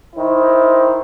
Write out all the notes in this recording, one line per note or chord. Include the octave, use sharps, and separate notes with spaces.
D#3 E4 C5